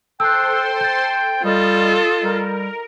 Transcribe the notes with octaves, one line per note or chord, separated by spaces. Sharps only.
A4 C5 G5 C6 E6 F#6
G6 A6
G3 F4 A4 D#5
G3 A#4